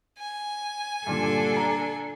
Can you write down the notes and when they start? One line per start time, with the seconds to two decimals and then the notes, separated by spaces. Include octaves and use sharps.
0.18 G#5
1.07 G2 A#2 D3 D4 A4
1.56 A#5